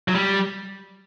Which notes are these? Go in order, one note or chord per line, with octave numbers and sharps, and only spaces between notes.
F#3
G3